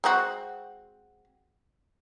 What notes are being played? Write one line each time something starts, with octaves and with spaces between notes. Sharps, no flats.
G#3 C4 F#4